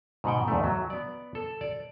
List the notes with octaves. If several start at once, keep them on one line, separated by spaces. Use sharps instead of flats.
G#2 B2 F#5 G5
E2 G#2 A3
F#3
B3 D5
A4
D5